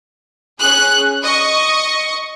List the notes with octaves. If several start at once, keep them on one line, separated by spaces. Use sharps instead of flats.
C#4 G#4 F#6
D#5 C#6